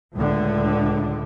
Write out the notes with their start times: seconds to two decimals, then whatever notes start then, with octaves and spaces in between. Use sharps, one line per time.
0.14 C#2 A2 D3